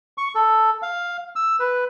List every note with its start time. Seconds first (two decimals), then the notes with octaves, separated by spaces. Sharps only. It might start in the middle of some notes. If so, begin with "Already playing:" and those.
0.18 C#6
0.35 A4
0.82 F5
1.36 E6
1.60 B4